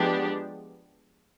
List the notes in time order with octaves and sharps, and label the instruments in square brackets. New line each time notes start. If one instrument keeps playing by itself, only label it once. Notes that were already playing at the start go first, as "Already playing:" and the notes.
Already playing: [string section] F3 G#3 B3 D4 G4